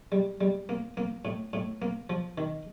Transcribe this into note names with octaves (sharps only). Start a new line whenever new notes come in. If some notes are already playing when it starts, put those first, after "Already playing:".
G3
G3
A#3
A#3
A2
A2
A#3
F3
D#3